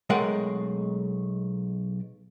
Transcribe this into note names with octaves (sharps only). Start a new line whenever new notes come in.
B1 G#3 A3 A#4 F#5 G5